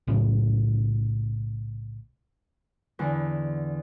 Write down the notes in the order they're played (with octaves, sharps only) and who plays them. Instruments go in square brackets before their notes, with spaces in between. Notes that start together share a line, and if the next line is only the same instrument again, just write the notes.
[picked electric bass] B1 A2 C#3
[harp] E2 D3